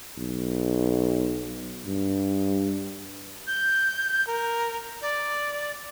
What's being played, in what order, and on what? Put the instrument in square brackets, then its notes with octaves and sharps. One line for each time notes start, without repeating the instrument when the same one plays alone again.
[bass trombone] B1
G2
[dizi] G6
A#4
D5